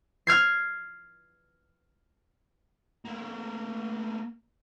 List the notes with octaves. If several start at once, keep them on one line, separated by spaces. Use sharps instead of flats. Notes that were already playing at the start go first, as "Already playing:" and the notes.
F6 G#6 C7
A3 A#3